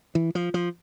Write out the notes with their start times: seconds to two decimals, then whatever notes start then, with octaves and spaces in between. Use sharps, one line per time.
0.15 E3
0.35 F3
0.54 F3